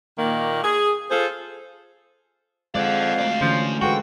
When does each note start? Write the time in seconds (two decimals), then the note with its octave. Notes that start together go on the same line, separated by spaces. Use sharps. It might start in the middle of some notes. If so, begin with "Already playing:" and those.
0.18 A#2 D#3 A#3 A#4
0.63 G#4
1.10 F4 G#4 A4 C5
2.75 F2 G#3 D5 F5 F#5
3.19 A3 D5
3.41 D3 E3 F3 C#4
3.82 F3 G#3 F#4 A4 B4 G5